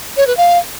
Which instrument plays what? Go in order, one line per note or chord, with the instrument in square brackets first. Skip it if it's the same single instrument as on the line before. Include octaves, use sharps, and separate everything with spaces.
[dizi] C#5
B4
F5